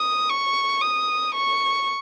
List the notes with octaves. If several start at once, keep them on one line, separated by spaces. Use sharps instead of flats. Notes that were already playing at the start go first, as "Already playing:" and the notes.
Already playing: D#6
C#6
D#6
C#6